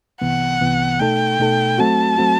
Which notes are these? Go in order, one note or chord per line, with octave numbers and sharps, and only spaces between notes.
C2 C3 E3 B3 F#5
C2 C3 E3 B3
B2 A3 D#4 A4 G5
B2 A3 D#4 A4
F#3 A3 C4 F#4 A5
F#3 A3 C4 F#4